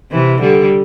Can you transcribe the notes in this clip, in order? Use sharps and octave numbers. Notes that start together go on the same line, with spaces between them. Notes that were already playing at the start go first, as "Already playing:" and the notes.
C3 E3
D3 G3